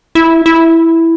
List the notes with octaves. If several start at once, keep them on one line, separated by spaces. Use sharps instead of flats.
E4
E4